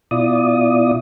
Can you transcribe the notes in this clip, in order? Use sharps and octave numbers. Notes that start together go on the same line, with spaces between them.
B2 E4 F4 D5 D#6